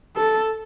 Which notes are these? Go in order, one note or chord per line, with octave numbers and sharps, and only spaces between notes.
A4